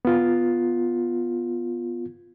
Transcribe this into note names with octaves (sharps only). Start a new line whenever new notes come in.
B3 F4